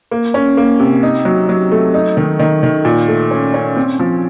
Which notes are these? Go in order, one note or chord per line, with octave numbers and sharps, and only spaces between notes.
A#3
C#4
A#3
C3
D#4
F#3
F#3
A3
D#4
D#3
D#3
D#3
A#2
A3
C#4
C#4
C4
F3